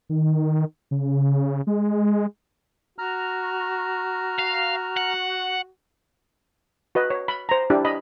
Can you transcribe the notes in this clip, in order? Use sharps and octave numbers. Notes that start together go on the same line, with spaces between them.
D#3
C#3
G#3
F#4 A#5 F6
F5
F#5
F#4 B4 D#5
C#5
B5
C5 A#5
D4 E4 G4
D#5 B5